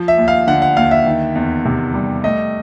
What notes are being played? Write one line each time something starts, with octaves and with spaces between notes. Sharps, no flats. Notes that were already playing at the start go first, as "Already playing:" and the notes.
Already playing: F3
E5
D#2
F5
D3 F#5
F#5
D#2 F5
E5
D#3
E2
C3
G3
A3 D#5